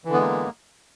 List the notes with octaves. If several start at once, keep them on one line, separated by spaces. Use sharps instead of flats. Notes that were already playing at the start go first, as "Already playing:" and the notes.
D3 E3 G#3 A#3 B3